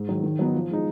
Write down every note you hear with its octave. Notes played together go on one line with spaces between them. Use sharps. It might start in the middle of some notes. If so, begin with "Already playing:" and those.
Already playing: G#2
D#3 F#3
D#3
F#3 B3 D#4
F3
G#3 D#4